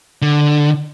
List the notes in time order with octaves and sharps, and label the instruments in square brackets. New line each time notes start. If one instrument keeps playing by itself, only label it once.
[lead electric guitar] D3